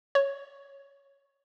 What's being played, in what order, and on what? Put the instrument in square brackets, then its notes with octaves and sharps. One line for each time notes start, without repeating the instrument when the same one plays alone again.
[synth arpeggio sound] C#5